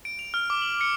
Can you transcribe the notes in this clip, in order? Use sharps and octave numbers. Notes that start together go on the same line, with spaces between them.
D7
F7
F6
D6
F#7
C#7